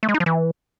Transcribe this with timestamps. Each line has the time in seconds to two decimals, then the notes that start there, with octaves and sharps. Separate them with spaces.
0.03 A3
0.09 G#3
0.14 D#4
0.20 F3
0.26 E3